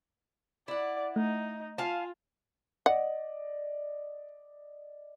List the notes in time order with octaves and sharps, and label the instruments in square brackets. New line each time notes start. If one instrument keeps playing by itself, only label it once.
[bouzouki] E4 F#5 [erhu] D5
[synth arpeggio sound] A3 [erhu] D#4
[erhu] F4 [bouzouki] F5 G#5 A5
[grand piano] D5 D#5 [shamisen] F#5